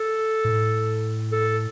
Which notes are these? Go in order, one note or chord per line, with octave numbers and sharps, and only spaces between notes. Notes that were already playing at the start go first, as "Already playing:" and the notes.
Already playing: A4
A2
A4